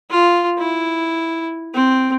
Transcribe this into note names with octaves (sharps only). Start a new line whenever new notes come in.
F4
E4
C4